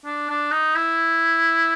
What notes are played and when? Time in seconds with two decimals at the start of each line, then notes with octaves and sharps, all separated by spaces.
0.05 D4
0.29 D4
0.51 D#4
0.75 E4